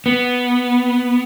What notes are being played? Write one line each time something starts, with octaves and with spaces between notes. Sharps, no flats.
B3